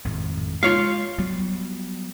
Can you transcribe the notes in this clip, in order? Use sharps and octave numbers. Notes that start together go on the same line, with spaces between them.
G#1 F2 A2
G#3 F4 C#5 F5
F#3 G3 B3